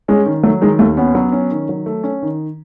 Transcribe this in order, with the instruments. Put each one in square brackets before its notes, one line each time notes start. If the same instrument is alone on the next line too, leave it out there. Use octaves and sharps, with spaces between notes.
[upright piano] G#3 [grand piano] C#4
[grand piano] D#3
[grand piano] F#3 [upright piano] A3
[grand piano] D#3 [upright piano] G#3
[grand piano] D#2 [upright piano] A3
[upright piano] B3 [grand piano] C#4
[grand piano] F#3
C#4
D#3
F#3
A3
C#4
D#3